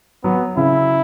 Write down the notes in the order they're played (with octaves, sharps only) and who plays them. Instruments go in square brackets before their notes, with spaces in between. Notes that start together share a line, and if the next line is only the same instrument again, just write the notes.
[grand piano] F#3 [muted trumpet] B3
[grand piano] C#3 [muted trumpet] E4